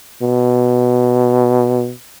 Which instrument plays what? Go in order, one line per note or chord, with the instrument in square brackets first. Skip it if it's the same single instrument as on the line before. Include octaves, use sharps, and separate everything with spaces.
[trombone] B2